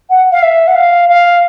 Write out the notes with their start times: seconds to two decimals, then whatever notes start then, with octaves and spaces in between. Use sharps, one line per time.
0.10 F#5
0.32 F5
0.42 E5
0.68 F#5
0.76 F5
1.09 F5